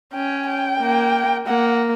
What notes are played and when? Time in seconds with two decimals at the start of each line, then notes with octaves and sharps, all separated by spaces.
0.13 C#4 G5
0.47 G5
0.80 A#3
1.47 A#3 F#5